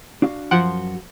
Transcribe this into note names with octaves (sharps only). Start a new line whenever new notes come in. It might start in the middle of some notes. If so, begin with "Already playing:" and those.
D4 F#4 F5
F#2 F3 F#4 F#5 C6 D7